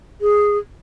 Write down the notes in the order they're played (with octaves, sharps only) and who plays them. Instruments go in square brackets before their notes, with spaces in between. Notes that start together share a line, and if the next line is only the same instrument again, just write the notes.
[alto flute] G#4